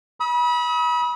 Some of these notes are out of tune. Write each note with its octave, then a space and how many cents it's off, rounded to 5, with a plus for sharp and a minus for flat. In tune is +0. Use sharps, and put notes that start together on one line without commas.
B5 -30 D#6 +40